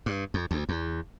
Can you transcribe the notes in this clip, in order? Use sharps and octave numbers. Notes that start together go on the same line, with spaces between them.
G2
F2
D2
E2